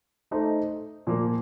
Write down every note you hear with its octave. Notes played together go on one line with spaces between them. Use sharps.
A3 D#4 A4 C5
A#2 F3 A#3